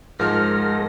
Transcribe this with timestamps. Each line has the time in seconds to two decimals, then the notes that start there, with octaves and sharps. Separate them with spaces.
0.19 G#2 F3 G#3 A#4 F6 A#6